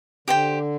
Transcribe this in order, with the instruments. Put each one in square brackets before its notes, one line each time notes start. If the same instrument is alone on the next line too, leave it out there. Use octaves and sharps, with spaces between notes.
[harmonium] D3 [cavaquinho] G4 C5 G5